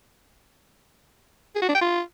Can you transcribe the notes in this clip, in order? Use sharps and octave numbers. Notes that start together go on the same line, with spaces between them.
G#4
F#4
D4
G5
F4